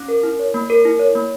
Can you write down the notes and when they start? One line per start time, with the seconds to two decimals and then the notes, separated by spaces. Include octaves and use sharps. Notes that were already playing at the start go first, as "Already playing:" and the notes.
Already playing: C#4
0.08 A#4
0.23 E4
0.39 C#5
0.54 A#3
0.70 A#4
0.85 E4
0.99 C#5
1.15 A#3